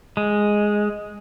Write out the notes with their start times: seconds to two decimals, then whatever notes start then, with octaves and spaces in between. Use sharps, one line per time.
0.17 G#3